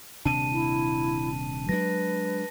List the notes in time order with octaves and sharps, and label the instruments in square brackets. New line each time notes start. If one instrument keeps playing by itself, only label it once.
[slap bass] D#1 C3 D4 [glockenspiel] A5 D#7
[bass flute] E4
[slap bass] F#3 G#3 D4 [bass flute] B4 [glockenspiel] A#6